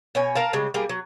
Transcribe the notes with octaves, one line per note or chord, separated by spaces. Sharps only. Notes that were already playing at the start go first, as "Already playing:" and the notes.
B2 C#5 G#5
A#4 F5 A5
C#3 G3 G#3
G3 A#3 G#4
F#3